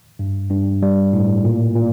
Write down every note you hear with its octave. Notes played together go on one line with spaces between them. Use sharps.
G2
G2
G3
A2
A#2
A#2